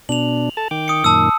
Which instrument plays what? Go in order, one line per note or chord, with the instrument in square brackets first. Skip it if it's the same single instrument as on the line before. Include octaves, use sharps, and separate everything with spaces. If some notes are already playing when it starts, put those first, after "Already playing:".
[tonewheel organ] B2 D4 [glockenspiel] F7 F#7
[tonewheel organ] A4 A5
D#3 G5 D6
[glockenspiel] D#6 C#7
[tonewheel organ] F#2 A#2 D#3 [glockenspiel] A5 D#6 E6